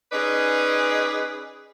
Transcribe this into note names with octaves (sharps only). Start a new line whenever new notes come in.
C#4 D#4 G#4 B4 D5